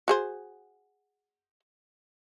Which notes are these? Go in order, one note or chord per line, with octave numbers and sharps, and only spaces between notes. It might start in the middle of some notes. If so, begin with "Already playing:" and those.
F#4 G#4 C5